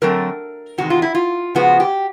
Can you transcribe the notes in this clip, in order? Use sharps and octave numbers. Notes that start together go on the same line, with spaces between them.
D3 F#3 A3 C4 A#4
E2 C3 D#3 G#3 F#4
F4
E4
F4
C#3 F3 G#3 B3 F#4
G4